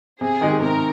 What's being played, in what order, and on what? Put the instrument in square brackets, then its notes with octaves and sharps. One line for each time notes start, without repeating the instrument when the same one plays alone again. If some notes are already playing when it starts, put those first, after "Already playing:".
[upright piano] C3 [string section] G#4
[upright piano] D#3 G#3 D#4 G4
[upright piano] C3 [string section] A#4